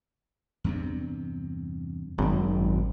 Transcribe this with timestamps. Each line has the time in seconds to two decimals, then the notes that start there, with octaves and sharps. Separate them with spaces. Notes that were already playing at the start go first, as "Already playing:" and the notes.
0.64 E2 G2 C3
2.18 G#1 F#2 G3